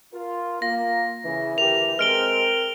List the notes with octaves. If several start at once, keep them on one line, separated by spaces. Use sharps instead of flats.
F4 A#4
A#3 F4 A#6
C#3 E3
D2 G4 A#4 F7
G#3 C4 A#4 F6 D7 G7